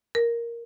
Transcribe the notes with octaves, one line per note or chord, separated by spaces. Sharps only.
A#4